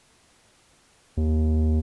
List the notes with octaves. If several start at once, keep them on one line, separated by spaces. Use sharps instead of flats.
D#2